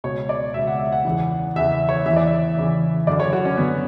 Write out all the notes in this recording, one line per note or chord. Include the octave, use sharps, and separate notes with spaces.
C#2 B2 C#5
D5
C#2 B2 E5
F#5
E5
F#5
E2 C#3 E3
E2 C#3 E3 E5
E5
C#5
E2 C#3 E3 E5
D5
E5
E2 C#3 E3
F#2 D3 D5
C#5
F#4
C#4
F#2 D3 B3